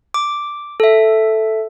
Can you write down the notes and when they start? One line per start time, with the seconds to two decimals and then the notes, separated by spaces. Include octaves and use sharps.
0.14 D6
0.80 A4 E5